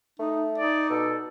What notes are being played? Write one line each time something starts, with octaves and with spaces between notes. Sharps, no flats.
A3 D#4
D#4 D5
B2 A4